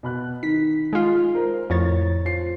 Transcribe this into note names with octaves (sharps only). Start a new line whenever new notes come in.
B2 B5 F#6
D#3 B6
G#3 F4
A#4 C5 A#5
F2 A2 C#5 A6
F4 C5 C7